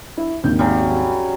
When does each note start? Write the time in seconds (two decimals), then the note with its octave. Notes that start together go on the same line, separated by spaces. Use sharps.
0.17 E4
0.44 G#1 D#2 G6
0.59 C#3 F#3 G3